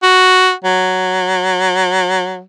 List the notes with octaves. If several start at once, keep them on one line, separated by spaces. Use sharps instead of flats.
F#4
F#3